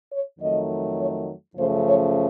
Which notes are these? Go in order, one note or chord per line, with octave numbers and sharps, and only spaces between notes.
C#5
F2 D#3 F#3 A3 D#5
C#5
F#2 C#3 F3 A3 C5
C#5